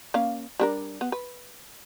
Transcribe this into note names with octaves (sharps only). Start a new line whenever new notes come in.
A#3 C#4 F5
G3 D4 A#4
B3
B4